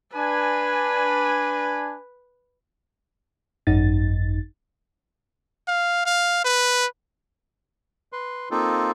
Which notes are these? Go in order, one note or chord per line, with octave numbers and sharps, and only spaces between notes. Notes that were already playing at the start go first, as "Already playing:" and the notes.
D4 B4 G#5
G#1 F#2 D#4 A6
F5
F5
B4
B4 C6
A#3 C4 D#4 F4 A4